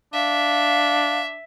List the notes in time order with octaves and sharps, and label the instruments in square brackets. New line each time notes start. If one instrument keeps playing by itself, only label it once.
[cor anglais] D4 [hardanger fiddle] E5 [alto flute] F5